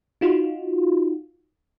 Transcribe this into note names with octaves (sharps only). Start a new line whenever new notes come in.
D#4 F4 F#4